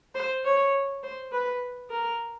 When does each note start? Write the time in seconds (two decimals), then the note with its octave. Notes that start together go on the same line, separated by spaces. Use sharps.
0.15 C5
0.44 C#5
1.03 C5
1.32 B4
1.90 A#4